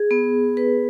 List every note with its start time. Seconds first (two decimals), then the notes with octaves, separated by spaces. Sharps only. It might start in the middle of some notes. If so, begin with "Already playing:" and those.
Already playing: G#4
0.11 B3
0.57 B4